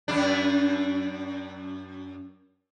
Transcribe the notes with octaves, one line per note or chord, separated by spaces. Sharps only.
F#2 D4